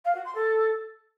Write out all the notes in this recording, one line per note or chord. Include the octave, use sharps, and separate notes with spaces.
F5
F#4
C6
A4